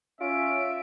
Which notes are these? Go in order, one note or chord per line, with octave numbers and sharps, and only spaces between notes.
C#4 F4 E5 D7